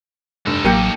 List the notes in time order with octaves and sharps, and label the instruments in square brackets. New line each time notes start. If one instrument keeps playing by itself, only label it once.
[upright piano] F1 G2 [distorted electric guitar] D#4 A4
[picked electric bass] A1 F#3 [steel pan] A#3 G4 A#4 [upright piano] G6 C#7 D#7